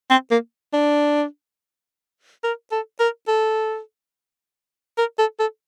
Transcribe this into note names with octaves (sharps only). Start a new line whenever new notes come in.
C4
A#3
D4
A#4
A4
A#4
A4
A#4
A4
A4